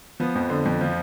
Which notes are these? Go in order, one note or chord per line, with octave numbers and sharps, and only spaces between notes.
F3 B3
F2
D3
F2
F3